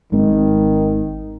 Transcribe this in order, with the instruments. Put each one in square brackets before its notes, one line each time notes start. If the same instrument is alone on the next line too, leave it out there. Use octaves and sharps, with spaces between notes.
[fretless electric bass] G#1 G#3 C4 [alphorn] D#3